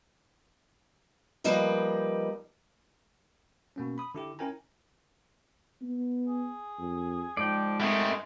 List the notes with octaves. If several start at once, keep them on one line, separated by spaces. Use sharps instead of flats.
F3 G3 A#3 D#4 B4
B2 A#3 C#4
B5 D#6
D3 E4 G4
C#4 E4 A#4 G5 G#5 A#5
B3
G#4
F2
G#2 F3 D5 G5
G#3 A3 C4 G4 A#4 G#5